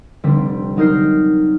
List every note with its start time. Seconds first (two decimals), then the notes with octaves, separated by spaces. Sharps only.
0.24 F1 D3 G3 C4 B6
0.76 F#3 D#4 A#4 G6 C7